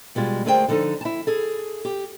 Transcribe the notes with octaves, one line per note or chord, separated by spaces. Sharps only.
B2 G3 G#3 F4
D2 A3 G#4 A#4 C5 G5
D3 F3 D#4 A4
E4 A5
G#4 A4
G4